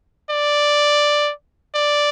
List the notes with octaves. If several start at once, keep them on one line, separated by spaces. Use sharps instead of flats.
D5
D5